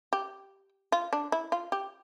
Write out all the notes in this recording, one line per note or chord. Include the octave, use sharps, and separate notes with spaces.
G4
F4
D4
E4
F4
G4